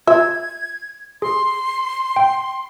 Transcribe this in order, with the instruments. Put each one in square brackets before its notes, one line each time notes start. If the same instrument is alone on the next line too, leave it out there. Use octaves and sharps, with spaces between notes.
[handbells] F4 [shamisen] E5 [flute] G#6
[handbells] G#4 [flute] C6
[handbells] G5